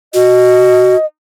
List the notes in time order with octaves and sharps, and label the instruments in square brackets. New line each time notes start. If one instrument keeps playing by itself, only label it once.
[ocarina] F#4 [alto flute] D#5